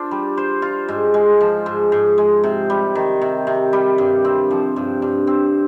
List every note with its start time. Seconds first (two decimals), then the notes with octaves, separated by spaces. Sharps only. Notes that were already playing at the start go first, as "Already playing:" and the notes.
Already playing: D4 F4 C5
0.11 G3
0.37 C5
0.62 F4
0.88 G#2
1.14 G#3
1.41 F3
1.66 G#2
1.92 G#2
2.18 G#3
2.43 C3
2.70 G3
2.95 D#3
3.22 C3
3.47 C3
3.73 G3
3.98 G2
4.25 C4
4.51 F3
4.76 G2
5.02 G2
5.27 C4